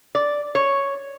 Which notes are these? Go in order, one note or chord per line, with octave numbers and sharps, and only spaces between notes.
D5
C#5